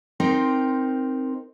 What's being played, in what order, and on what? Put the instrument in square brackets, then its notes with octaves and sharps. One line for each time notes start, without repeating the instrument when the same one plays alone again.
[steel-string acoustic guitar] C4 D#4 A#4 C5